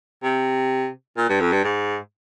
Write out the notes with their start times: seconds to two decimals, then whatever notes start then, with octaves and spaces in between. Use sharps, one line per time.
0.23 C3
1.17 A#2
1.29 G2
1.41 F2
1.52 G2
1.64 G#2